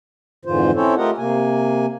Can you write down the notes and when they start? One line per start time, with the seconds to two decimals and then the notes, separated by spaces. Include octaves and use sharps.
0.45 F2 G#2 D3 E3 F4 C5
0.75 C4 C#4 E4 A4 C5 C#5
0.97 A3 F4 G4 A#4 D#5 F#5
1.17 C3 A#3 G#5